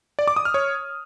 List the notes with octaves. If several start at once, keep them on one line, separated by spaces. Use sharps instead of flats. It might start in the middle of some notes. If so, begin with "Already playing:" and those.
D5
D6
D#6
F6
C#5